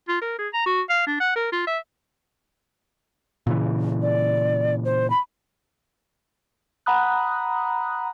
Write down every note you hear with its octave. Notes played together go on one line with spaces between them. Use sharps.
F4
A#4
G#4
A#5
F#4
F5
D4
F#5
A#4
F4
E5
A#2 C#3 E3
D5
C5
B5
F#5 A#5 B5 D#6 F#6